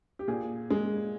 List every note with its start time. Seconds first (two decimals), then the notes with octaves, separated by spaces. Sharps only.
0.19 G4
0.28 A#2 G#4
0.71 G#3